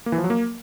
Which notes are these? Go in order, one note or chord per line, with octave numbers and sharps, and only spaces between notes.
A#3
E3
F3
F#3
A#3